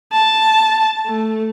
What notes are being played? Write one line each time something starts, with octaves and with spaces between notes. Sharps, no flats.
A5
A3